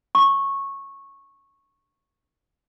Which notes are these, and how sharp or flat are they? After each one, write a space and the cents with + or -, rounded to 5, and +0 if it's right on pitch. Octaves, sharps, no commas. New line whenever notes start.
C#6 -10